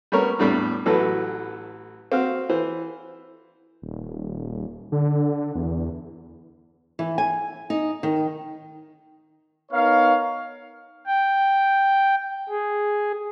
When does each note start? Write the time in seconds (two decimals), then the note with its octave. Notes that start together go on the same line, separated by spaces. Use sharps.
0.12 G3 A3 B3 C#4 A#4 C#5
0.39 E2 A2 G3 D4
0.86 A1 E3 F#3 A3 A4 B4
2.12 C4 F#4 F5
2.49 E3 C5
3.82 D#1
4.92 D3
5.55 E2
6.99 E3
7.18 G#5
7.70 D#4
8.03 D#3
9.72 B3 D#4 A#4 C#5 F5
11.06 G5
12.50 G#4